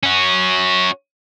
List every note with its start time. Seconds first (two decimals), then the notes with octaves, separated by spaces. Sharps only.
0.03 C#4 F#4